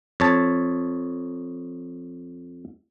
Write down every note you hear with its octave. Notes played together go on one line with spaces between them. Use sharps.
F2 C#5 A5